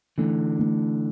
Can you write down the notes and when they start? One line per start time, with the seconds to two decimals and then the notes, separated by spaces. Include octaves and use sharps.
0.18 D3 E3 A3
0.59 A3